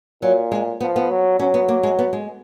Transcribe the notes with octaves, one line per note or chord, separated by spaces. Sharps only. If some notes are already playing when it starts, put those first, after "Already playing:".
A#2 F#3
G#3
F3 B3
B3
F#3
F#3 C#4
B3
A#3
G#3
B3
G#3